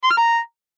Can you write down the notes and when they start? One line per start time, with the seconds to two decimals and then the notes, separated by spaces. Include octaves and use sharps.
0.03 C6
0.10 F6
0.17 A#5